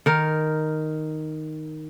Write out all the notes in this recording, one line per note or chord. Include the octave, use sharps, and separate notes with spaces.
D#3 A#4